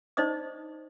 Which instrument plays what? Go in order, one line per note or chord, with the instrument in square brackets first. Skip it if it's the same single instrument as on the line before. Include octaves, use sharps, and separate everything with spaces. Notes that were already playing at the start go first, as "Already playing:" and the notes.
[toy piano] D#4 C5 D5 D#5 D#6